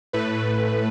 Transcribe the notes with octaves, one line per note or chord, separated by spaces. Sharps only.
A2 A3 B4